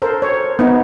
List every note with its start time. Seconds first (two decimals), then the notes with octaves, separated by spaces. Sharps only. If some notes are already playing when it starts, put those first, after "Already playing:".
0.02 A4 A#4 C5
0.22 C#5
0.59 B3 D#4